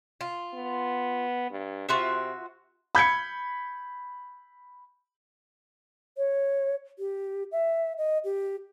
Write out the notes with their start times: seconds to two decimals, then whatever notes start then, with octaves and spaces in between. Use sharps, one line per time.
0.21 F4
0.54 B3
1.51 G2
1.89 C3 F4 F#4 E5
2.95 B5 G6 G#6 C#7
6.17 C#5
6.99 G4
7.52 E5
7.98 D#5
8.25 G4